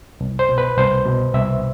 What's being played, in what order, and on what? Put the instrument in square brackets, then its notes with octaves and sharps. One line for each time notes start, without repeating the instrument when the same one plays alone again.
[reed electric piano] C2
C5
B2
B4
C2 C5
B2
C2 E5